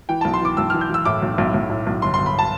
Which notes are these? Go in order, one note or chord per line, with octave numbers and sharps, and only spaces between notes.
E3 G5
B1 A5
C6
E3 D6
B1 E6
E3 F6
G6
E3 E6
A2 D6
B1
B1
B1
A2
B1
G1 C6
G1 C6
B5
A5